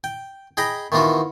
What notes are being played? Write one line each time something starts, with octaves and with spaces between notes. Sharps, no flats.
G5
G#4 D#5 G5 A#5 B5
D#3 E3 B3 F4 F#4